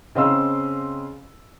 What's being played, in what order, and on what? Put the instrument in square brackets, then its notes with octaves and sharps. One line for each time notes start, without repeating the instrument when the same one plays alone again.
[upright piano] C#3 C4 D#5 F5 C6 E6